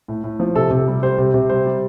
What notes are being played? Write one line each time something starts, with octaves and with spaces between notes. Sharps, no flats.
A2
A2
F3
C3 A4
C3
G3
G3 C5
C3
C3
G3 C5
G3